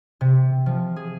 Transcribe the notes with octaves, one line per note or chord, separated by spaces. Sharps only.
C3
F3
G#4